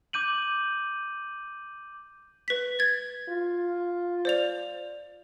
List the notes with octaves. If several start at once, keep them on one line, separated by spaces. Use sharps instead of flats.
D6 G6 D#7 F#7
B4 B6
G#6 A6
F4
C5 D5 F7